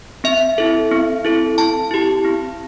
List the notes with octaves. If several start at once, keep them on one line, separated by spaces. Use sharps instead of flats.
C4 E5
E4 A4
C4
E4 A4
C4 A5
E4 G4
C4